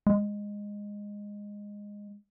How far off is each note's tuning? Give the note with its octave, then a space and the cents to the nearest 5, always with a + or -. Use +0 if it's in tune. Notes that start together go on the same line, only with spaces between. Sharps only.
G#3 -15